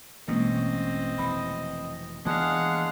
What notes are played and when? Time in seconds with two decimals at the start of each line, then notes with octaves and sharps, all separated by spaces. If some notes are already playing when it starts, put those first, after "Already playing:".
0.28 A1 B2 E3 G#3 A#3 C4 C#4 D#5
1.18 F1 E3 B5
2.25 E3 G#3 A#3 B3 D4 G#4 F5 F#5